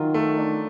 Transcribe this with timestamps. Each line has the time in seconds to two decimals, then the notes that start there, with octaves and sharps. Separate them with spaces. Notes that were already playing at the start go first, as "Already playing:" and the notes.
Already playing: D#3 F#3 F4
0.14 A3
0.39 D4